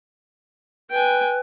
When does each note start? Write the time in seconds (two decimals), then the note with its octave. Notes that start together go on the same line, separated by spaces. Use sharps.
0.91 B4 G5 G#5